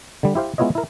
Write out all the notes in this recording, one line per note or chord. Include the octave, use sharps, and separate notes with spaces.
D3 G3
E4 G4 C5 F5
G#3 B3 E4 F4 C#5 D#5
E4 A#4